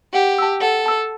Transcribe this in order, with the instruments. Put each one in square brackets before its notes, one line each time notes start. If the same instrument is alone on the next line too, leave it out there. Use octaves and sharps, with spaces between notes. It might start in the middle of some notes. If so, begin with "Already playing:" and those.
[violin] G4 [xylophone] F#5
[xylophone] A5 E6
[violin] A4 [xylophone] F#5
[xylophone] A5 E6